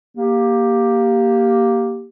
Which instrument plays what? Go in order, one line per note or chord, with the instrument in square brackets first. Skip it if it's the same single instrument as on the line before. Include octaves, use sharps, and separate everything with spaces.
[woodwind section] A#3 G4